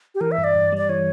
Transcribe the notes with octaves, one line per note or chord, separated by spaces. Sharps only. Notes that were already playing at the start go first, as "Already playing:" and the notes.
G4
E3 A#4
E5
G2
D5
G2
G3
D5
E3 C#5